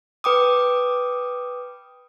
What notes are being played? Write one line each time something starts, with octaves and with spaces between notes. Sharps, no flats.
B4 G5 D6 D#6